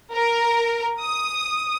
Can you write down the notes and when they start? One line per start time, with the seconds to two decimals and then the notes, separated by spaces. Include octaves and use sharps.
0.14 A#4
1.01 D#6